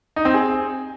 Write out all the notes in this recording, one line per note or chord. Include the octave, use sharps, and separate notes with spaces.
D#4
C4
G#4